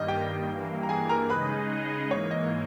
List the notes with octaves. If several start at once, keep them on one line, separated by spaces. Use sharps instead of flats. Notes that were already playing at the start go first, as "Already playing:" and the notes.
Already playing: G2 D#3 G3 A#3 D#5
G4 G5
G2 E3 A#3
A#5
G#4 G#5
A#4 A#5
C#3 G#3 D#4 G#4 B4 D#5 B5
G#2 E3 A#3 C#5
D#5